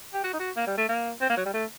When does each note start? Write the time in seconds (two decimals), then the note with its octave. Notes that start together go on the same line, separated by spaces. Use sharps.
0.13 G4
0.23 F#4
0.33 D#4
0.39 F#4
0.56 A#3
0.67 G3
0.77 A3
0.89 A#3
1.21 C4
1.30 A#3
1.37 F#3
1.45 G3
1.54 A3